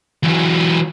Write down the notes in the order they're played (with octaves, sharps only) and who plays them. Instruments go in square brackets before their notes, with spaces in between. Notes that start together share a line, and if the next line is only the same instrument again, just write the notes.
[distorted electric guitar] E3 F#3